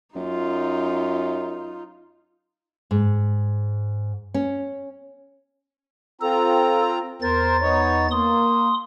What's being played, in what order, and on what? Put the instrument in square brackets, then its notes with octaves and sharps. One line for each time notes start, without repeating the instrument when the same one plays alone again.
[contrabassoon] F#2 [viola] D#4 F4
[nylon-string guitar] G#2
C#4
[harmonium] C4 F4 A#5 [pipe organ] A4
[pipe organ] E2 A6 [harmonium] A#4 C5
[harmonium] B3 D#4 C#5
[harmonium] A#3 [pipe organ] C6 D#6